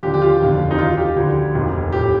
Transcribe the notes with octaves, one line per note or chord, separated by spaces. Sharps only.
D#2 D3 F3 G4
G4
F4
F1 D#2 D3 F3
D#4
D#2 D#3 F4
F4
G4
D2 D3 F3
F1 D#2 D#3
A2 F3 G4